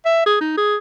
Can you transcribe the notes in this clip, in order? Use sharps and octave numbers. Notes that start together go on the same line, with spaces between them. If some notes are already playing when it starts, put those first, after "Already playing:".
E5
G#4
D#4
G#4